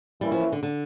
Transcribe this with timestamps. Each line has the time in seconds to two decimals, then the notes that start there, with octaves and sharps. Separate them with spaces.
0.21 E3 G3 A#3 C#4 E4
0.32 F3
0.52 D3
0.63 D3